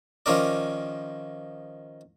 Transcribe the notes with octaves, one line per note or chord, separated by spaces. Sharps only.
D#3 F3 C#4 A#4 D5